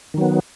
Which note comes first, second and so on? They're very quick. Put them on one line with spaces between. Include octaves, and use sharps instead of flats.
D#3 F#3 B3